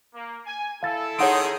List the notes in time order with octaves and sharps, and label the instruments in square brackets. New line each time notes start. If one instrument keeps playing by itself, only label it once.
[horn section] A#3
G#5
[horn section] E4 A4 [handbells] F5 A6
[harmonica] D#3 C6 D#6 [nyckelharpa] D#4 G#4 [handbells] C#5 F#5 D7